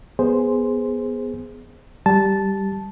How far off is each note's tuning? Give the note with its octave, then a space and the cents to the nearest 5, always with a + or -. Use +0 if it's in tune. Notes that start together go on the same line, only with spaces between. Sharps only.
B3 +0 G#4 +0 C5 +0
G3 -5 A5 -10